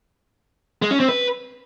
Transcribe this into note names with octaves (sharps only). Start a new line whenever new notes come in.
G#3
C#4
C4
B4